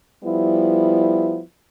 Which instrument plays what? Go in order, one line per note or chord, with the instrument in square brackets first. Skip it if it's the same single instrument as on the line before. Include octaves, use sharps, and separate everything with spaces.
[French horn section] F3 G3 B3 E4